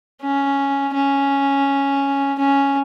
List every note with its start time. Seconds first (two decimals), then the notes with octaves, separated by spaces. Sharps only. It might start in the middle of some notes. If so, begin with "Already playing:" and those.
0.22 C#4
0.94 C#4
2.38 C#4